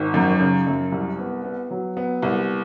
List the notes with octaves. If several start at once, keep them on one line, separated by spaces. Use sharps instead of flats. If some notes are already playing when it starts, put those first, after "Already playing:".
Already playing: G#1
F#2
C#3
F#2
C2
B3
B3
F#3
B3
C2